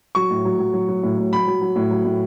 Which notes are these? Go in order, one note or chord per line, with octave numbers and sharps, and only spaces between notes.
F#3 C#6
A2
F#3
F#3
F#3
F#3
A2
A2
F#3 B5
F#3
F#3
A2
F#3
A2